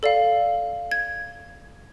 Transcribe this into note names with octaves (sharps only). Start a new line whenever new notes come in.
A4 D5 F5
G#6